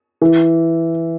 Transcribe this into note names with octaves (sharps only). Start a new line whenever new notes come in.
E3